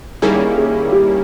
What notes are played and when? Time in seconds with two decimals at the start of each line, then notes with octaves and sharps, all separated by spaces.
0.22 D#3 G3 A#3 C#4 E4 G#4
0.57 G#4
0.92 G4